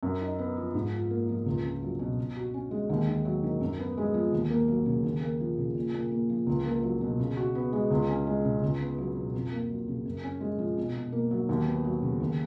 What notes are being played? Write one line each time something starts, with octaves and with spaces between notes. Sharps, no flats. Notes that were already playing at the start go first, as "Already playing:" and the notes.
F#2
D#4
B3
F3
G#2
F4
A#3
F3
C#2
C#4
F#3
B2
B2
F#4
C#4
G#3
D#2
D#2
F#3
D#3
F#2
B3
G#3
F3
D#2
A#3
F#3
C#3
D#2
A#3
F3
C#3
A#2
A#2
A#3
F3
C#2
A#3
F#3
B2
C#3
F#4
B3
G#3
C#2
C#4
G#3
C#3
C#2
B3
F#3
B2
F2
A#3
F#3
C#3
F#2
C#4
G#3
F3
B2
B2
A#3
F#3
D#2
B3
F#3
C#3
D#2